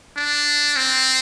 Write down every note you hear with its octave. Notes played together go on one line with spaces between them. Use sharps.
D4
C4